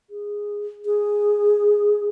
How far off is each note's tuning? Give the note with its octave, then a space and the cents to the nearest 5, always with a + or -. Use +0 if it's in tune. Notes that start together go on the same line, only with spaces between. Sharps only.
G#4 -10
G#4 -5